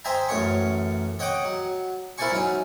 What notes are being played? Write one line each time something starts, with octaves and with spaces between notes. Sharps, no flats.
C5 D#5 E5 G5 G#5 A#5
A1 F#2 A#4 C#5 C#6
C#5 D#5 F#5 G5 D6 D#6
F#3
E4 A#4 C5 D5 G#5 C#6
F#3 C#4 D#4